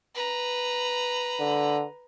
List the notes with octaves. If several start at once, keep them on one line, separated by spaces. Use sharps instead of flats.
B4 A#5
D3